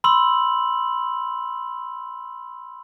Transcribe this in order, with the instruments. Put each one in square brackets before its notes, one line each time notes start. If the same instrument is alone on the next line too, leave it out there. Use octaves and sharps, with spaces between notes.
[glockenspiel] B5 C6 E6 F#7